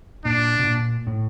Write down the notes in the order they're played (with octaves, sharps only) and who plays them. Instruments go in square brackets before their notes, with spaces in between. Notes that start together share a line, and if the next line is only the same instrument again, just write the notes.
[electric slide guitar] A#2 [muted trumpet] D4
[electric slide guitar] B2
A#2
A2